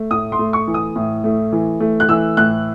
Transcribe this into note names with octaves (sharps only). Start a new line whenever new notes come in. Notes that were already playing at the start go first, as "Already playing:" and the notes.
Already playing: A3
A2 D#6
C6
A3
C#6
E3
D#6
A2
A3
E3
A3
F#6
E3 E6
A2 F#6